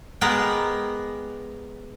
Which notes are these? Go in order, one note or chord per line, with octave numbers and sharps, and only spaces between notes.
G#3 B3 G4 G#4 A#4